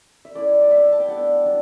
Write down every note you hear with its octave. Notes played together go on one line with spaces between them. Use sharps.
E5
A3 C#4 E4 D5
D5
A3 E4 E5
A5
G5
G3 B3 D4 F#5
F#3 B3 D4